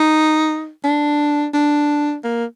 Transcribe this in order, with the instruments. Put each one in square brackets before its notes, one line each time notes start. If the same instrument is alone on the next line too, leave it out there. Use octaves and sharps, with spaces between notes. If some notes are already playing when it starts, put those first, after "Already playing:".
Already playing: [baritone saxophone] D#4
D4
D4
A#3